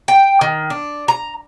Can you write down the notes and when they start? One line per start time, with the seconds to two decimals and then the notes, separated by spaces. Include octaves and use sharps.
0.08 G5
0.41 D#3
0.70 D4
1.08 A#5